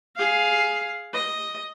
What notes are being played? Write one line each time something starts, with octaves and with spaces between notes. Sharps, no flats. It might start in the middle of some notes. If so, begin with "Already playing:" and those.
G#4 F5
D#5